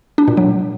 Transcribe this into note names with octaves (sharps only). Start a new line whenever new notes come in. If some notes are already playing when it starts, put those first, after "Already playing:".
D4
A#2
F#3